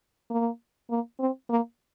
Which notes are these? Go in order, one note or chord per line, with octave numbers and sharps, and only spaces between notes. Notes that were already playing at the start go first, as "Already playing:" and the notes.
A#3
A#3
C4
A#3